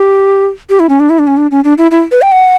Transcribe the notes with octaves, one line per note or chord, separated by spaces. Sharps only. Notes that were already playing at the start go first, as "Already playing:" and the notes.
Already playing: G4
G4
E4
C#4
D4
E4
D4
C#4
D4
C#4
D4
E4
E4
B4
G5
F#5